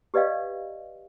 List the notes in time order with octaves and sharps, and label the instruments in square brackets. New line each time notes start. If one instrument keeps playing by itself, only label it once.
[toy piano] G4 B4 D5 D#5 F5 G5